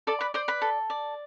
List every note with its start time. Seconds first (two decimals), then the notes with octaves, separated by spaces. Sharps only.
0.07 A4 D5 A5
0.21 B4 B5
0.34 C5 D5 C6
0.48 B4 B5
0.62 A4
0.90 D5